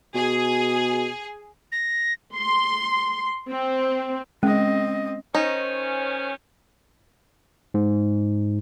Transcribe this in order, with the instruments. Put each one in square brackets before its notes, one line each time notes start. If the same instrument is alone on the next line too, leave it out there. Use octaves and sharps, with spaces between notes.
[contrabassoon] B2 [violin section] G#4
[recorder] A#6
[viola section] C6
C4
[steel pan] G#3 [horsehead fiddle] C4 D#5 [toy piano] C#4
[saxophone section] D#3 C#4 [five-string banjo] D#4 [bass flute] C5
[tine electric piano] G#2